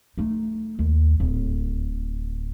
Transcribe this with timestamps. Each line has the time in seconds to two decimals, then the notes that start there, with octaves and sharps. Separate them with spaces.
0.18 A3 D#4
0.79 D#2
1.20 D1 A2